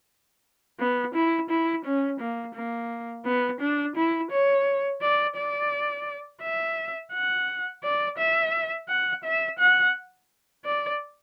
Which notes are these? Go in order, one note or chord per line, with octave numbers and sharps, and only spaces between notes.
B3
E4
E4
C#4
A#3
A#3
B3
D4
E4
C#5
D5
D5
E5
F#5
D5
E5
F#5
E5
F#5
D5